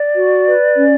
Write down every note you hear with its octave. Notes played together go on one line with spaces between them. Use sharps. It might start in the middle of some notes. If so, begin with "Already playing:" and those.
Already playing: D5
F#4
B4
C#4